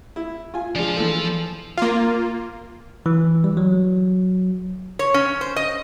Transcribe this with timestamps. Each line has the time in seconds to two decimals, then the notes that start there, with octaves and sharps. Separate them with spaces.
0.16 E4
0.54 F4 G#5
0.75 F3 G#3 D4 F5
0.97 E3 A4
1.77 A#3 F4
3.06 E3
3.44 G3
3.57 F#3
4.99 C#5
5.14 C#4
5.41 C5
5.56 D#5